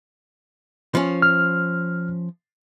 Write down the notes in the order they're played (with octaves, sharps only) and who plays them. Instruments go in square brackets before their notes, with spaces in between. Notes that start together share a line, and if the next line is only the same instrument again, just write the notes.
[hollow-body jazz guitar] F3 C#4
[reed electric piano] F6